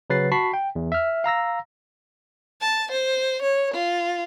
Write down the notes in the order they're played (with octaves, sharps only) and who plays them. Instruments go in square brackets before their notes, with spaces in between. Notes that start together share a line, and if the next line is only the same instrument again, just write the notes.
[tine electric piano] C#3 F#3 B4 A6 C7
F#4 A5 B5 C#6 B6 C7
G5
E2
E5 F6
F5 A#5 E6 A#6
[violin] A5
C5
C#5
F4